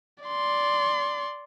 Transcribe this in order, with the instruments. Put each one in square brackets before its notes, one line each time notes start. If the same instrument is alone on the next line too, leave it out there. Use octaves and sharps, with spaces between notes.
[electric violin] D5 C6